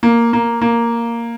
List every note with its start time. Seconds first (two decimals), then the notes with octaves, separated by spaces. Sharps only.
0.03 A#3
0.33 A#3
0.62 A#3